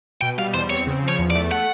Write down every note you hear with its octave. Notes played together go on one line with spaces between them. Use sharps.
B2 G5
G3 F5
E2 C5
C4 C#5
C#3
F3
C#5
E2
D5
A3
F#5